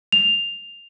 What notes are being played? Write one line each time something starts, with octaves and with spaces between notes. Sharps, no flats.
F7